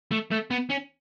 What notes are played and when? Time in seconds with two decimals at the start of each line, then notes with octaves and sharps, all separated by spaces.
0.12 A3
0.32 A3
0.51 B3
0.70 C#4